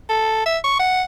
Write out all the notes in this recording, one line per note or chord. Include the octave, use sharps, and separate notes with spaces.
A4
E5
C#6
F#5